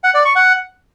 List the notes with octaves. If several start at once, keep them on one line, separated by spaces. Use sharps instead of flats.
F#5
D5
C#6
F#5